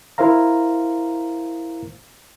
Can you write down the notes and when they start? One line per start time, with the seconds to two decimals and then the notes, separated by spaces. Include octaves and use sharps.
0.18 E4 A#4 C5 F5 A#5